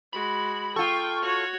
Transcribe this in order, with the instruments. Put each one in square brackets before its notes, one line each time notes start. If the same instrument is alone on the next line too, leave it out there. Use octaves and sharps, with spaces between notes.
[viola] G#3 F#4 [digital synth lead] B5
[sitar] F4 A4 [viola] G5 [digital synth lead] C#6
[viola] F#4 C#5